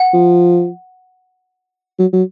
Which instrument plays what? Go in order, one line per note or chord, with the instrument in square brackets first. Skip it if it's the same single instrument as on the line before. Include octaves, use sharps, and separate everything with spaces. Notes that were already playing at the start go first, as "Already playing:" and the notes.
Already playing: [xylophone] F#5
[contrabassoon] F3
F#3
F#3